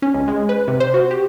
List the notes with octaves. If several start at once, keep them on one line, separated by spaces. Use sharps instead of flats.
C#4
C#2
G#3
B4
C3
C5
F#4
G4